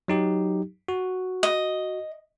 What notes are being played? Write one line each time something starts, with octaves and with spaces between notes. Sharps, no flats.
F#3 D#4 G4
F#4
D#5